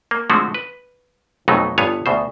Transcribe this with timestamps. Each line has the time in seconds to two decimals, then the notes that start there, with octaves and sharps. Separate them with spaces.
0.11 A#3
0.30 D3 F3 G#3 A3 C4 F#4
0.54 B4
1.48 B1 F2 B2 F#3 A3 D#4
1.78 G1 G2 B3 C#5 F5 G#5
2.06 D2 B2 C5